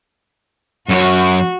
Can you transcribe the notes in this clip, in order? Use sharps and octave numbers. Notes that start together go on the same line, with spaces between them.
F#2 F#4 C#5